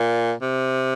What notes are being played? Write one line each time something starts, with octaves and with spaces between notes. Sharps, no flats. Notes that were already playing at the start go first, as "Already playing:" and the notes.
Already playing: A#2
C3